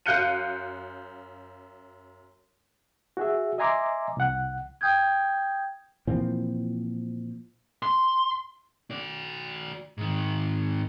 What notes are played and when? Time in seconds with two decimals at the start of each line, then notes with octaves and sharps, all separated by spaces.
0.06 F#2 F5 F#6 G6 C#7 D#7
3.17 F#4 G#4 E5
3.58 D#5 E5 G#5 A#5 C6 D6
4.17 C2 F#5
4.81 G5 D#6 G6 G#6
6.07 A#2 E3 F3 C4
7.83 C6
8.91 F#4 D5
9.98 G#2 D#3